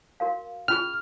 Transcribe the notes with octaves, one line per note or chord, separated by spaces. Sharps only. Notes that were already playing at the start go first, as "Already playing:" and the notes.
F#4 A#4 F5
C#4 F4 G#4 F6